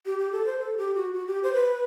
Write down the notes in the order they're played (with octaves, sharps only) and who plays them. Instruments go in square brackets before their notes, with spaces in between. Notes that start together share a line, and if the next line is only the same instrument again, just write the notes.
[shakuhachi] G4
G4
A4
C5
A4
G4
F#4
F#4
G4
C5
B4